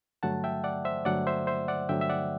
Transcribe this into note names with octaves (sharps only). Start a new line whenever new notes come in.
G2 D3 F#3 A3 F#5 A5
E5 G5
D5 F#5
C5 E5
G2 D3 F#3 A3 D5 F#5
C5 E5
C5 E5
D5 F#5
G2 D3 F#3 A3 E5 G5
E5
D5 F#5